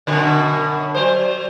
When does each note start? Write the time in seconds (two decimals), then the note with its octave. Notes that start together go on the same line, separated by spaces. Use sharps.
0.07 F#2 B2 D3
0.95 F#3 C5